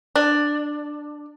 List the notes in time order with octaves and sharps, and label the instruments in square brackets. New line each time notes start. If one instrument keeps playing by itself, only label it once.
[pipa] D4